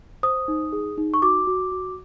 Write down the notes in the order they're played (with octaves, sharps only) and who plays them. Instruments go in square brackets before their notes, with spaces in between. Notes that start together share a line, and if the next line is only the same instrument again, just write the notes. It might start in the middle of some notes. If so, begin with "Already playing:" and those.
[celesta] C5 D#6
D#4
G#4
D#4
C#6
F#4 D6
F#4
F#4